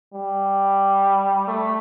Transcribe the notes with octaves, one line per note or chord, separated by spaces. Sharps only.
G3
A3